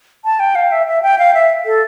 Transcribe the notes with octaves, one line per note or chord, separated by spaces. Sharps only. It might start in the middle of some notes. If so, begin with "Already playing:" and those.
A5
G5
F5
E5
E5
G5
F5
E5
A4